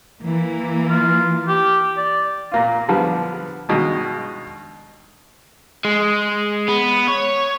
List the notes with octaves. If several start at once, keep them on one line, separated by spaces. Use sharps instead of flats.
E3 A#3
F4
G4
D5
A#2 A#3 F4
D3 F3 G3 B3
G2 B2 D#3 G#3
G#3
B3
C#5